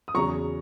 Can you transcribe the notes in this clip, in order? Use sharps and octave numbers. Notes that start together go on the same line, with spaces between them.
D#6
E2 C#3 F#3 A#5 C#6